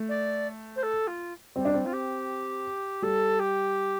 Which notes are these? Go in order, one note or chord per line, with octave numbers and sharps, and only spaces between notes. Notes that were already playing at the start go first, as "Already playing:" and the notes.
Already playing: A3
D5
C5
A4
F4
G3 C4
D4
C4
F4
G4
G3 A4
G4